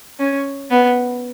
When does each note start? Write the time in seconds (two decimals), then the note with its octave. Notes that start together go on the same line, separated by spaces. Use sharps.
0.19 C#4
0.70 B3